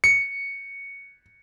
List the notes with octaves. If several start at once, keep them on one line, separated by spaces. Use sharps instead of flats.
C#7